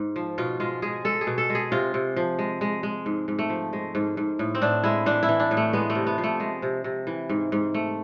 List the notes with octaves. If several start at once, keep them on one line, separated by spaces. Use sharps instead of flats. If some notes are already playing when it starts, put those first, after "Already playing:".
Already playing: G#2
F3
B2 F4
G#3 F4
G#3 G#4
G#3 A4
G#4
B2
A4
G#3
G#4
C3 F4
C3
F3
G#3
G#3
G#3
G#2
G#2
A3
F3
G#3
G#2
G#2
A2
C4
A2 D4
G#3 E4
E3 D4
E4
E3
D4
A2
A3
G#3 B3
A3
C3
B3
F3
A3
G#3
C3
C3
E3
G#2
G#2
A3